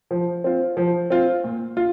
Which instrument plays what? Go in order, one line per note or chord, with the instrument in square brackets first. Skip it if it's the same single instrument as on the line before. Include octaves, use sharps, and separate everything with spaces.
[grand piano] F3
C4 F4
F3
C4 F4
A#2
F4